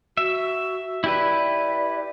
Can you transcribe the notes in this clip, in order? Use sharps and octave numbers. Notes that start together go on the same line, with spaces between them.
F#4 E5
E4 G4 B4 D5